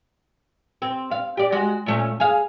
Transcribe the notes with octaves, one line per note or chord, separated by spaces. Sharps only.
C4
F5
G4 D5
G#3 F#4
A#2 A3 C#4
G#4 F5